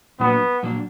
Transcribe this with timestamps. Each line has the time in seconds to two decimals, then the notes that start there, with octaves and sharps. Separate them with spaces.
0.20 A#2 F#3 A#3 B3 D4
0.63 A#2 F#3 A#3 D4